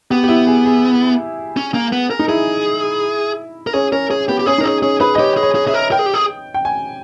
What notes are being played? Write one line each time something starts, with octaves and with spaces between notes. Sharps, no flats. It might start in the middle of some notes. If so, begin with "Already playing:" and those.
B3 G4
G4
E4
G#4
G#4
C#4
A#3
B3
A#4
D#4
E4 G#4
A#4
C#4 G#4
C#4 A#4
C#4 G#4
B3 G4
G4
C#4 G#4
D#4
A#4
C#4 G#4
C#4 G#4
G#4 B4
D#5
G4 C#5
G#4
C#5
G#4
G#4 E5
A#4
A#4 G5
G#4
G4
G#4
G5
G#5